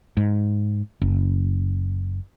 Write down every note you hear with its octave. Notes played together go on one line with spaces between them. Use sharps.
G#2
F#1